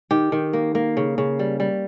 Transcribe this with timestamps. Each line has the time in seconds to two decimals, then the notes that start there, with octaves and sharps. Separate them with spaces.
0.11 D#3 G4
0.32 D#3
0.53 A#3
0.75 A#3
0.97 C#3
1.18 C#3
1.39 G3
1.60 G3